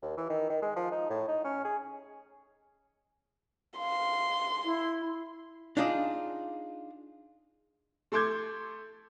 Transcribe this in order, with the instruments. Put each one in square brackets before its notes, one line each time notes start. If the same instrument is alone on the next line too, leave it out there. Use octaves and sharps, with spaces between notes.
[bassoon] D#2
E3
D#3
D#3
G#3
F3
D#4
A2
D#4
C#4
G#4
[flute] F5 [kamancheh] C6
[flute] E4
[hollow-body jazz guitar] D4 D#4 F4 G#4 D5
[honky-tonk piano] A3 A4 C6 D6 G6 G#6